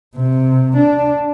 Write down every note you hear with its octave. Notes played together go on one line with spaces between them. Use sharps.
C3
D4